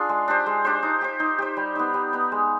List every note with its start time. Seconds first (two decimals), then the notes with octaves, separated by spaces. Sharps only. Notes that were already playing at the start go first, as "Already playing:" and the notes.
Already playing: D4 F4 G#4
0.09 G#3
0.28 D4 G4 C5
0.46 G#3
0.65 D4 G4 C5
0.83 D#4
1.01 G4 C5
1.20 D#4
1.39 G4 C5
1.57 G3
1.75 B3 D#4
1.94 G3
2.13 B3 D#4
2.32 G#3